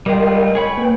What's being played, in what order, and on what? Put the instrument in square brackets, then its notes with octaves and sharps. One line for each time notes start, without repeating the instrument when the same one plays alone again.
[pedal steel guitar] G3 G#3 F4 [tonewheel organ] A#4 D#5 G5
[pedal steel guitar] G#4 C#5 B5
[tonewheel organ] A#3 B4 G5